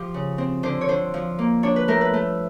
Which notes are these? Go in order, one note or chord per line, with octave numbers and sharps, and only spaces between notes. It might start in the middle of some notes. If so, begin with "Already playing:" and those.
Already playing: F3 G4
C#3
C4
D3 C5
C#5
D3 C5
F3
A#3
D4 C#5
B4
A3 A#4
B4
A3